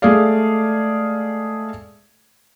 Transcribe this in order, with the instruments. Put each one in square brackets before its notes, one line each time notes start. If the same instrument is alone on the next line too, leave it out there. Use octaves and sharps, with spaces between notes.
[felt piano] G#3 A3 G#4 A4 D5 F5